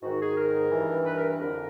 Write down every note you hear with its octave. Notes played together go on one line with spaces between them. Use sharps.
G#2 D#3 F#4
G#4
A#4
G2 E3
B4
A#4
F2 D3 A#4